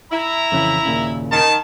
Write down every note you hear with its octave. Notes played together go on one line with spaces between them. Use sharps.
E4 A#5
F2 C#3 E3
D#2 A#2 C#3
D#3 A5